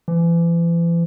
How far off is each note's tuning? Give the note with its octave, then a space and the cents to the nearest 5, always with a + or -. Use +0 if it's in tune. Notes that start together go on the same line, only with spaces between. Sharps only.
E3 +40